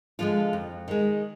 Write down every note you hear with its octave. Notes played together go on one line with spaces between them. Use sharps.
D3 F3 G#3 F4
F2
D#3 G#3